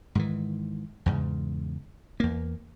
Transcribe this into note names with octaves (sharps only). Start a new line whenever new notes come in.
G#2 D#3 E3
E2 G#2 C#3
E2 A#3